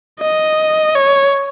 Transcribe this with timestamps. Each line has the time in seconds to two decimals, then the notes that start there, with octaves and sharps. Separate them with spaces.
0.21 D#5
0.95 C#5